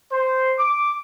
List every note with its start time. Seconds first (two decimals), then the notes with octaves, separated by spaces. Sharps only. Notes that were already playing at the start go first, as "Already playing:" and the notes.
0.11 C5
0.58 D6